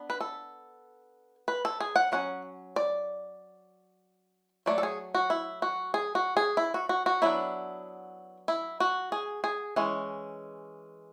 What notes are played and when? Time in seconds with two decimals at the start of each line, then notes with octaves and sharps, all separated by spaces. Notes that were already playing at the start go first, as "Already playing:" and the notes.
Already playing: B3 D4
0.10 B4
0.20 A4
1.48 B4
1.65 A4
1.80 G#4
1.96 F#5
2.12 F#3 C#4 F#5
2.76 D5
4.66 F#3 A3 D5
4.78 A4
4.83 G#4
5.14 F#4
5.30 E4
5.62 F#4
5.94 G#4
6.15 F#4
6.37 G#4
6.57 E4
6.74 F#4
6.89 F#4
7.06 F#4
7.22 F#3 B3 D4 E4
8.48 E4
8.80 F#4
9.12 G#4
9.44 G#4
9.76 E3 G#3 C#4